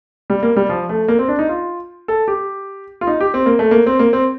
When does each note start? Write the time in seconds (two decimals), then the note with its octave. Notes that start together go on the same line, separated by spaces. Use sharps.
0.30 G3
0.43 A#3
0.56 G3
0.69 F3
0.89 A3
1.08 A#3
1.19 C4
1.28 D4
1.39 D#4
1.49 F4
2.08 A4
2.28 G4
3.01 F4
3.07 D#4
3.21 G4
3.34 C4
3.46 A#3
3.59 A3
3.71 A#3
3.86 C4
3.99 A#3
4.13 C4